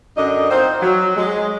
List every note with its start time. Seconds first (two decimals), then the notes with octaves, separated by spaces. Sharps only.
0.16 F#2 D3 D4 D#5
0.49 C4 D#4 F4 C5
0.81 F#3
1.17 G#3